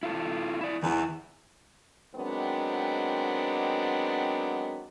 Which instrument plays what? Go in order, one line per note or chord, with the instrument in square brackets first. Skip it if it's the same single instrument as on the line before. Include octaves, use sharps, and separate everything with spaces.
[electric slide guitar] E4 F4 A4
E4 D5
[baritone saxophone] E2 [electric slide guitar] D#3 E4
[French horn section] D#3 F#3 G#3 B3 C4 D4